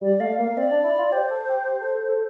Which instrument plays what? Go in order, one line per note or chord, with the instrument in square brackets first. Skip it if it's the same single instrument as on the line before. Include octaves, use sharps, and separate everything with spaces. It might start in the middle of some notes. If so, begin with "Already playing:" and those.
[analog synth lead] G3 [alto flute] D5
[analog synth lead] A3 [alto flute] F5
[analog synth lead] A#3 [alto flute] F5
[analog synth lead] C4 [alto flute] D5
[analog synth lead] D4
E4
F4
[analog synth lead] G4 [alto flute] C5
[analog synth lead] A4
G4
G4
A4
A4
A4